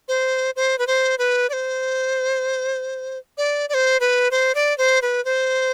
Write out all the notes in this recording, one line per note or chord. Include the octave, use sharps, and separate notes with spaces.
C5
C5
B4
C5
B4
D5
C5
D5
D5
C5
B4
C5
D5
C5
B4
C5